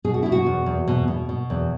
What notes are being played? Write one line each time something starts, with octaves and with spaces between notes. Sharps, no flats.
B2 G#4
F#4
B2 E4
F#4
E2
E2
B2
B2
B2
E2